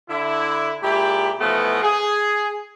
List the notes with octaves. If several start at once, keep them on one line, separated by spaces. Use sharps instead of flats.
D3 E4
A#2 G#3 E4 G4
B2 E3 F3 A3 B3 F#4
G#4